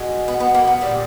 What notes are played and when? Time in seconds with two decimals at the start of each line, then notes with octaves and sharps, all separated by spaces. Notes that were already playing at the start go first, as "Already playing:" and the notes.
Already playing: B2 G#3
0.28 B3
0.40 B3
0.55 A#3
0.67 B3
0.81 A#2 G3 B3